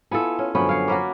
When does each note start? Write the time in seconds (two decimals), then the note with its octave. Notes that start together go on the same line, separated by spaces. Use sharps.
0.11 B3 E4 F4 A4 G#5
0.39 C#4
0.55 F#2 D3 F3 F#3 B3 G#5 B5 C#6
0.69 C#5 F5
0.88 A#3 C#4 F#4 F#5 B5 D6